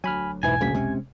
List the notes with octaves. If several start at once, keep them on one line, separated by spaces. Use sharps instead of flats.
D2 F#3 G#5 B5 F6
E1 B1 G#2 E3 E4 G#5
D1 D2 C#3 G3 A#3 B6
C3 G#3 C4 C#4